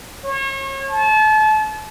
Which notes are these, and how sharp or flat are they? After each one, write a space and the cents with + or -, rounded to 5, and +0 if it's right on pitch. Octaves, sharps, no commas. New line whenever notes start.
C#5 -35
A5 -35